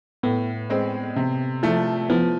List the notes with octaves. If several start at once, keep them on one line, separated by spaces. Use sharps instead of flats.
A2 B3
G#3 C4
C3
F3 A3
F3 B3